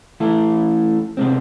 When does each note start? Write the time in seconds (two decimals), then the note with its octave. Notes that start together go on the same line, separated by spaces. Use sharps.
0.20 E3 A3 E4 A4
1.17 C3 G#3 C4